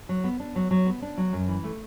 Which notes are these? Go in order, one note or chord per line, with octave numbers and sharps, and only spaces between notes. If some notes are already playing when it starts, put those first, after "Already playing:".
F#3
B3
D4
F#3
F#3
B3
D4
F#3
F#2
E3
A3